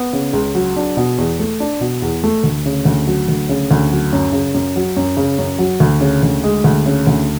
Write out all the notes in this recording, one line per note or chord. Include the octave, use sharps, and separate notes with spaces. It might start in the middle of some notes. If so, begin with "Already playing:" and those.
Already playing: B3
C#3
C#2
F#3
D4
B2
E2
A3
D4
B2
E2
A3
D2
C#3
D2
F#3
D2
C#3
D2
F#3
F#2
C#3
F#2
F#3
F#2
C#3
F#2
F#3
D2
C#3
D2
G#3
D2
C#3
D2